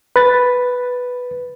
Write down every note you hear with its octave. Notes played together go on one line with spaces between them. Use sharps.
B4 A6